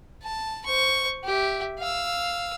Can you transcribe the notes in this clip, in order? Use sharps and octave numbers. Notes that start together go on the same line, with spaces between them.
A5
C5 C#6
G4 E5
F5 E6